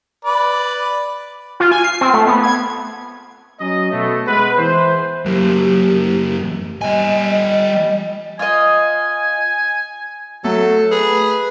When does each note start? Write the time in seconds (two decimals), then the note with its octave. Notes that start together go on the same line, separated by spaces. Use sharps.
0.25 B4 D5
1.60 F4
1.72 G#5
1.84 C7
2.01 C4
2.13 A3
2.27 B3
2.44 G#6
3.60 F#3 C#4 D#5
3.91 B2 A3
4.27 G#3 B3 B4
4.57 E3 E4 C5
5.25 F#2 A#3 G4
6.81 G3 D#5 G#5
8.39 F4 D#5 G#5
10.44 F#3 A3 A4
10.92 G#4 B4